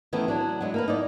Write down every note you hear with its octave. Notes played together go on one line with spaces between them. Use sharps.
D#3 E3 A3 B3 C#4
F#3 D4
F#3 G#3 E4
A#3 A#4 B4
D#4 E4 D5